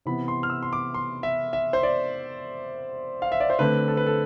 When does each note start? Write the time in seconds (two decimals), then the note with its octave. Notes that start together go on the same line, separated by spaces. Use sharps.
0.06 C3 E3 B3 B5
0.28 C6
0.43 F6
0.50 E6
0.63 C6
0.73 D6
0.94 C6
1.23 E5
1.53 E5
1.73 C5
1.83 D5
3.22 F5
3.32 E5
3.40 D5
3.50 C5
3.59 D3 A3 C4 B4
3.88 A4
3.97 B4
4.06 A4